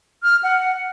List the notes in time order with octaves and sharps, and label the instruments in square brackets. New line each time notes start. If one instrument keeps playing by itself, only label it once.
[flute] F6
F#5